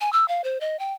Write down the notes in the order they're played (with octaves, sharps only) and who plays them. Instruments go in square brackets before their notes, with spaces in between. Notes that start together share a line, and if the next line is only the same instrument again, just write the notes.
[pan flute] G#5
E6
F5
C5
D#5
G5